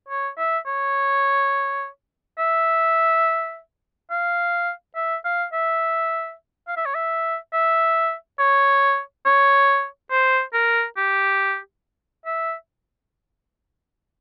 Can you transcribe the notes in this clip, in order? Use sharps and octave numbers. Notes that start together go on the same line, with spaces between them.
C#5
E5
C#5
E5
F5
E5
F5
E5
F5
E5
C#5
E5
E5
C#5
C#5
C5
A#4
G4
E5